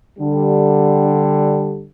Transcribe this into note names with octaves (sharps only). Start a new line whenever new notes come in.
D3 G3